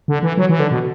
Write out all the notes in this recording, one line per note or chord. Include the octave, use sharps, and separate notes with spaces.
D3
E3
F#3
E3
D3
B2